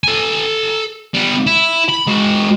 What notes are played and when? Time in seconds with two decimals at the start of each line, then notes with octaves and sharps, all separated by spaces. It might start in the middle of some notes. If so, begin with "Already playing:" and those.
0.04 A4 G#5
1.14 G3 B3
1.47 E4
1.89 B5
2.07 G#3 F#4